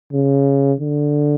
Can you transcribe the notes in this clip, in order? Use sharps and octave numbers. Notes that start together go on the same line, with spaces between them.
C#3
D3